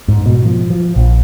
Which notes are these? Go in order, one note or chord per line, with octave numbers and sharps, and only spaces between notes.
G#2
B2
F3
F3
A#1